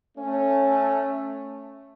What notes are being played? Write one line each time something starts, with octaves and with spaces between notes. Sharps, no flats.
A3 C#4